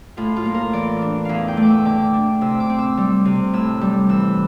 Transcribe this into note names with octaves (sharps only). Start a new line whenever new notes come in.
A2 F4
F4
A#3
A#4
E3 D5
D4
E2 E5 F5
G5
A3
D6 E6
D3 D6
D4
C3 E6
D6
C4
E6
G3
C3
A2 E6
G3
E3 E6